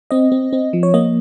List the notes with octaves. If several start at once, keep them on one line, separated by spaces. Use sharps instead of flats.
C4 D#5
C4
C4
F3
C#5
A#3 D#5